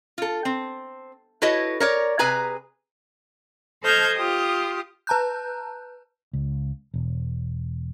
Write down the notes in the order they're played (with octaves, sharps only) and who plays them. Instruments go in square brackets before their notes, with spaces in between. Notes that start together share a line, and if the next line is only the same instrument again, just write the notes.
[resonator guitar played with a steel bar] F4 A4
C4
E4 F#4 A4 B4 C#5 D#5
A#4 C#5 D5
C3 G#4 B4 G#5 A#5
[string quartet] A4 C5 D#5 F6 G6 G#6
F4 G4 D#6
[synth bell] B4 A5 A#5 F#6 G6
[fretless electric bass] C#2
E1